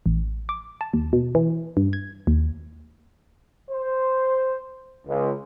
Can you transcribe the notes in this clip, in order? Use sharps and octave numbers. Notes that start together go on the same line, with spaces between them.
A1
D6
A5
D#2
B2
E3
G2
G#6
D#2
C5
C#2